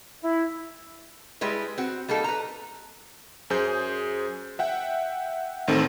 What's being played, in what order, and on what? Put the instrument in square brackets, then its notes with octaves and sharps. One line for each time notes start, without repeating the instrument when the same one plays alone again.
[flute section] E4
[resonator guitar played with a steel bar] G3 G#3 E4 B4
C4 F#4
G3 A#3 D#4 A4
B4 A#5
[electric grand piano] F#2 G#4 C5 G6
E5 F#5 G5
A1 D#3 C4 A4